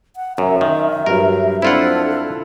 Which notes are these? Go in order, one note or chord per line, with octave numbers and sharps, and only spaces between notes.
F#5
F#2 E5
D#3
G2 F#3 A#4
C4 D4 E4 F4 A4 F#5